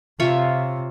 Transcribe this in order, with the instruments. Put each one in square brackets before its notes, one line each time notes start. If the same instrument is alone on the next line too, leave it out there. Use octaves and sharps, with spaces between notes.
[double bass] C3 [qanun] F4 C#5 E5